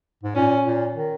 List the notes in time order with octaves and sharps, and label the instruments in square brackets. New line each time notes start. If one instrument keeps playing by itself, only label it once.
[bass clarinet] G#2
[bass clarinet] A#2 [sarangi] C#4
[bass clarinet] A#2
D#3